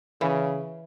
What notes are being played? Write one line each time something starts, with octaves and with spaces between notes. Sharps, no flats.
C#3 E3